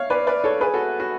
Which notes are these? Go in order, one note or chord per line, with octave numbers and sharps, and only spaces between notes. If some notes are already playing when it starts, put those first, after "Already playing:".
Already playing: C#5 F5
B4 D5
B4 D5
A4 C#5
G#4 B4
F#4 A4
F#4